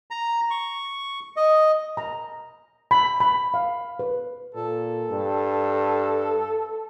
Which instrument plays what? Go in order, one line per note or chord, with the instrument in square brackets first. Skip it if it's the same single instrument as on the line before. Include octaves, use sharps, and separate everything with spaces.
[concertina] A#5
C#6
D#5
[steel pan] A#5
B5
B5
F5
B4
[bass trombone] A#2 [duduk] A4
[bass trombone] G2